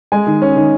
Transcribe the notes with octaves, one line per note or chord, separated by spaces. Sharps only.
G#3 G#5
D#3
C#4
D#3